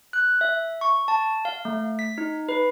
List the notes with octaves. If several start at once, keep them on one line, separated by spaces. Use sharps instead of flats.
F#6
E5
C#6
A5
F5
A3
B6
D#4
B4